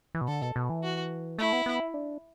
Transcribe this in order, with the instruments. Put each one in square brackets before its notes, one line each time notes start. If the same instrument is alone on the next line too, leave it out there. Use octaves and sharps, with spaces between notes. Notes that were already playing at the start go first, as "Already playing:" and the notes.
[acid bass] E3
B2
[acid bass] D3 [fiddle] A4
[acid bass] B2
B2
E3
[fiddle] F#4
[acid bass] A3 [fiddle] E4
[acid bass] B3
B3
E4
D4